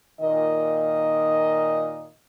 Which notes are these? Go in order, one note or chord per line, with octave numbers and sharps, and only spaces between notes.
A#2 D#3 D#5